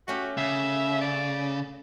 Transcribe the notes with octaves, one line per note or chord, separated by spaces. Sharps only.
A3 C#4 F#4 G4
C#3 E5
D5 A5